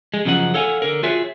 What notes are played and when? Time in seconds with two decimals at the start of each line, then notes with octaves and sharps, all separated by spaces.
0.14 G#3
0.25 F#2 C#3 F3 D#4 F#5
0.54 A4 C#5 F5 F#5 G#5
0.82 D3 A#4
1.03 F4 F#4 G#4 C#5 E5